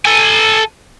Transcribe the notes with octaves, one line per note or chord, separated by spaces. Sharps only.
A4 G#5